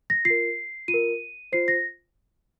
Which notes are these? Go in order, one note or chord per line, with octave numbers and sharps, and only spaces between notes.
A#6
F4 C7
A#4
F4 D#7
A#4
F4 C5 C7
A#6